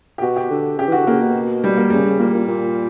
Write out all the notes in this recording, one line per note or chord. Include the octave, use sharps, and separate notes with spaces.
G4
B2 F#4
G4
D3
C#3 G4
E3
F#4
D3
C#3 A#3
B2
G3
A#3
C#3 G3
C#3
A#2 A#3
A#2
A#2